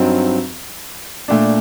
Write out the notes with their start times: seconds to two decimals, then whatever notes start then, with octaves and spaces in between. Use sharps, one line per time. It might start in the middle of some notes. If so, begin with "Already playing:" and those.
Already playing: G2 F#3 C4 D#4
1.28 A#2 A3 D4